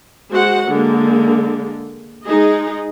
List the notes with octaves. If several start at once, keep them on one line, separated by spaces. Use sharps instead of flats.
G#3 F#4 C5 F#5
D3 G#3 A#3
G#3 D#4 G#4 D#5